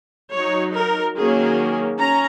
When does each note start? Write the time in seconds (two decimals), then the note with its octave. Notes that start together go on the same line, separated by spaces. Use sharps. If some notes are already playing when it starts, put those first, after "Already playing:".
0.33 F#3 D#4 C#5
0.74 A#4
1.15 D#3 F#3 A#3 C#4 G#4
1.97 C#4 A#5